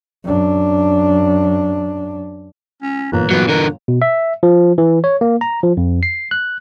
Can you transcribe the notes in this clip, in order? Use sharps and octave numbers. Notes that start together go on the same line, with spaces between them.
F#2 D4
C#4
G1 A#2 E3 A#5
F#3 B3
D3 A#4
B2
E5
F3
E3
C#5
A#3
A#5
F3
F2
C7
F#6